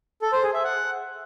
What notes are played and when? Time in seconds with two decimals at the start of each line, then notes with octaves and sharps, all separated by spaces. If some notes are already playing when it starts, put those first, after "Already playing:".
0.22 A4
0.33 C5
0.43 G#4
0.53 E5
0.64 F#5